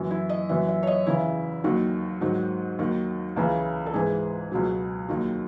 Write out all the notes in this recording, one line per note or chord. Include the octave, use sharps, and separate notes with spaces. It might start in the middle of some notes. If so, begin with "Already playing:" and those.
Already playing: F#2 E3
E4
D#5
F#2 E3 E5
E5
C#5
D#5
E2 C#3 E3 E4
D#2 D#3 F#3 F#4
G#2 D#3 F#3
D#2 D#3 F#3
C#2 C#3 E3
A4
G#2 E3 G#4
C#2 B2 F#3
D#2 D#3 F#3